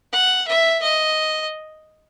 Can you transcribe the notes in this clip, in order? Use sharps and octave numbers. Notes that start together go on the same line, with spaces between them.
F#5
E5
D#5